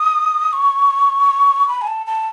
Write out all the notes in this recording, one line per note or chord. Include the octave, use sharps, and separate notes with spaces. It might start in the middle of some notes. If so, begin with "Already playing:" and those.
Already playing: D#6
C#6
B5
G#5
A5
A5